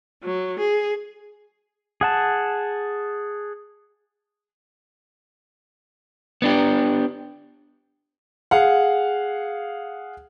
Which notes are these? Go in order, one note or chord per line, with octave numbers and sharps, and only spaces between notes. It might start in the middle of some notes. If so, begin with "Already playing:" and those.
F#3
G#4
G#4 F#5 A5
B3 D4 G4
G#4 F5 F#5